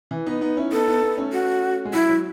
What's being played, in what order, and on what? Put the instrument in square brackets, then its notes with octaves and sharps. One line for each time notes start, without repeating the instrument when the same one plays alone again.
[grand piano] E3
B3 D#4
B3 D#4
C#4 E4
[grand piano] B3 D#4 [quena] A4
[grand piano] B3 D#4
B3 D#4
A3 C#4
[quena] F#4
[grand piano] G#3
[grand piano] F#3 [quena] E4
[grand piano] F#3